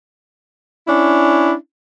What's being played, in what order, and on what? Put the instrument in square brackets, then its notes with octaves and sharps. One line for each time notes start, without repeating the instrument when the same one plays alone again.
[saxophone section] C#4 D4 E4